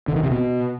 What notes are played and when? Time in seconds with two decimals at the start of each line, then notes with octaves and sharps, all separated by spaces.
0.08 D3
0.16 D#3
0.23 C3
0.31 B2